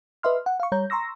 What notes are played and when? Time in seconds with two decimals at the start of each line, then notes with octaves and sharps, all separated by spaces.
0.23 B4 D#5 E5 C6 F6
0.46 F#5
0.60 F5 C#6
0.72 G3 C#5 A#5 G6
0.90 A#5 C6 C#6 E6 A#6